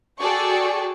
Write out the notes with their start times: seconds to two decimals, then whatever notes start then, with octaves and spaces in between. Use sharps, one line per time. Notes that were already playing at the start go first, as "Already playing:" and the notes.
0.20 F#4 G#4 A4 D5 G5 C#6